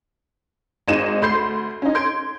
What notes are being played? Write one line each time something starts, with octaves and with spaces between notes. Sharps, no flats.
G#1 G#3 D#4 D#7 E7
D2 B5 C6 G6 C7
C#4 D#4
C6 G6 G#6 D7